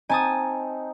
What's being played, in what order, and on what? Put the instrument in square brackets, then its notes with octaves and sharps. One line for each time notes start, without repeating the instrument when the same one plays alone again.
[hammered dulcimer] C4 D#4 [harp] G#5 A5 D#6